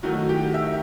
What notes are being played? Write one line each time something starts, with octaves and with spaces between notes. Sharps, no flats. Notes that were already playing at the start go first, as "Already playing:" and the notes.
D#3 F#3 A3 D#4 F#4
G4
E5